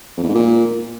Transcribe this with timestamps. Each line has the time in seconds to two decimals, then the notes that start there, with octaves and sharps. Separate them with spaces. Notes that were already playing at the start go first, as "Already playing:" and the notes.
0.17 F2
0.23 E2
0.29 G#2
0.35 A#2